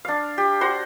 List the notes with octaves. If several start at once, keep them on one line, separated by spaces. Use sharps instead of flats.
D4 F5
G4
F#4 C5 C6